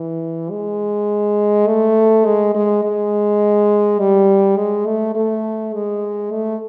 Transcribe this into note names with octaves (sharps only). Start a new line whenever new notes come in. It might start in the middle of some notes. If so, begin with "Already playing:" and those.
Already playing: E3
G#3
A3
G#3
G#3
G#3
G3
G#3
A3
A3
G#3
A3